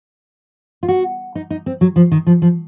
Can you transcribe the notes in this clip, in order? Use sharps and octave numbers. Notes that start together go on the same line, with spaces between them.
F4
F#4
D#4
D#4
C4
F#3
F3
D#3
F3
F3